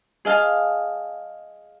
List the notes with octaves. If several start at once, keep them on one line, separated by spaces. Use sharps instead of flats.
G#4 D#5 F5 A5